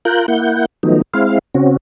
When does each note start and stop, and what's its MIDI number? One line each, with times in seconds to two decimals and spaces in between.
0.05 0.26 65
0.05 0.26 70
0.05 0.26 90
0.05 0.26 91
0.28 0.65 58
0.28 0.65 64
0.28 0.65 78
0.28 0.65 91
0.83 1.02 51
0.83 1.02 53
0.83 1.02 54
0.83 1.02 57
0.83 1.02 59
0.83 1.02 63
1.14 1.39 56
1.14 1.39 60
1.14 1.39 64
1.14 1.39 77
1.55 1.77 49
1.55 1.77 60
1.55 1.77 61
1.55 1.77 66